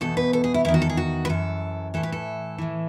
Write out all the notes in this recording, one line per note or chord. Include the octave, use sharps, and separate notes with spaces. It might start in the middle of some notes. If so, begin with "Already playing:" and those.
E2 B2 A4
B4
A4
G#4
E4
E2 D#3 E4
F#4
A4
G#4
F#4
B4
F#2 E3 A4
A2 E3 A4
B4
A4
A2 E3